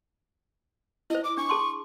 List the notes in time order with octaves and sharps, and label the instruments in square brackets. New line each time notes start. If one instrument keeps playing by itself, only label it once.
[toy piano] E4 C5 [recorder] D#5
[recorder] D6
[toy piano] D4 [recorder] C#6
[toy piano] G#4 A5 C6